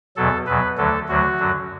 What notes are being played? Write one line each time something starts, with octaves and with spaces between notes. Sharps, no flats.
E2 B2 F#3 A4
E2 B2 F#3 B4
D2 D3 F#3 A4
D2 D3 F#3 F#4
F#2 D3 F#3